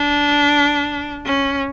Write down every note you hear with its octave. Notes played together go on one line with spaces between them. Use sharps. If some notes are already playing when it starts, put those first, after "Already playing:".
Already playing: D4
C#4